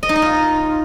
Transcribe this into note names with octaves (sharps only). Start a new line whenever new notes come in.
D#5
D#4
D#5
F4